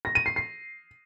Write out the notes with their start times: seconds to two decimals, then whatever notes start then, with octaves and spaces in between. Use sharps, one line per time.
0.05 A#6
0.15 D#7
0.26 C7
0.36 C7